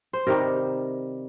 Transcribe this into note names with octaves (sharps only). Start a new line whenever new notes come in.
C5
C3 D#3 G3 A#4